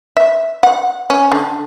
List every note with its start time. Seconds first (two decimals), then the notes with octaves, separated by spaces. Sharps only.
0.17 E5
0.63 F#5
1.10 C#4
1.32 D3